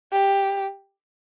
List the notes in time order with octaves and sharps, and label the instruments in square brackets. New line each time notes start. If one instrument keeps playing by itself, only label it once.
[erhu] G4